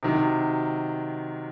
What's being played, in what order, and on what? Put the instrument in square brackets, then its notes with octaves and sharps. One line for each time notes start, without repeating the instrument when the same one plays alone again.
[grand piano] C3 D#3 F#3